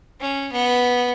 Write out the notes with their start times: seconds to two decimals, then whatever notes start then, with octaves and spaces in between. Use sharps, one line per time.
0.21 C#4
0.52 B3